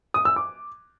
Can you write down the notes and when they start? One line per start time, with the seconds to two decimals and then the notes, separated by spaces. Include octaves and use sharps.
0.14 D#6
0.25 E6
0.36 D6